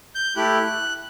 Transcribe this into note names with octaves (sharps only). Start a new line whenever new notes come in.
G6
A3 E4 G4 F#6